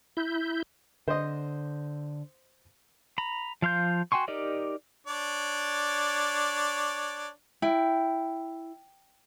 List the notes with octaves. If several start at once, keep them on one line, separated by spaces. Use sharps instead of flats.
E4 G6
D3 C5 D#5
A#5 B5
F3 F5 C6 G6
F#4 G5 G#5 C6 C#6
D#4 G4 A#4 D5 D#5
D4 C#5 D5
E4 G5